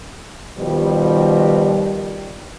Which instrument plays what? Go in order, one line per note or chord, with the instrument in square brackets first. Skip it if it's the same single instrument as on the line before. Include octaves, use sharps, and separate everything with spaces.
[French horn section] B2 D#3 F3 G3